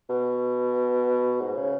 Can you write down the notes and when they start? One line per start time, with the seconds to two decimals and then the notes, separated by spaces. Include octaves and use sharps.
0.09 B2
1.41 G#2
1.57 C#3